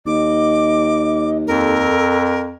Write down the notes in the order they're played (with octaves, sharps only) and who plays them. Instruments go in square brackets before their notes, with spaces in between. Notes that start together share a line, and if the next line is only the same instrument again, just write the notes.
[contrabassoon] D#2 [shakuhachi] D#5 [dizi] D6
[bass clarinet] F2 [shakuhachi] A4 [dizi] A#4